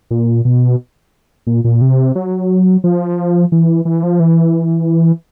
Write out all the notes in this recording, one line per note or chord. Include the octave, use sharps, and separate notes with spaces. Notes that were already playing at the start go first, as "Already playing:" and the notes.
A#2
B2
A#2
A#2
C3
F#3
F3
E3
E3
F3
E3